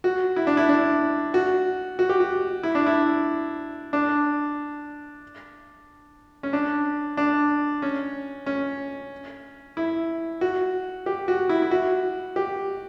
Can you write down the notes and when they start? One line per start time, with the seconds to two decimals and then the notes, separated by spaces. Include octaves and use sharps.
0.04 F#4
0.36 E4
0.47 D4
0.57 E4
0.69 D4
1.34 F#4
1.99 F#4
2.09 G4
2.20 F#4
2.63 E4
2.75 D4
2.86 E4
3.93 D4
6.43 C#4
6.53 D4
7.17 D4
7.82 C#4
8.46 C#4
9.77 E4
10.41 F#4
11.06 G4
11.28 F#4
11.49 E4
11.62 E4
11.71 F#4
12.36 G4